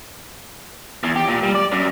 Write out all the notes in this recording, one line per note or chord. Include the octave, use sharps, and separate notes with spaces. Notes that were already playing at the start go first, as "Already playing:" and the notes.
E2
G4
A#2
G3
D5
F#2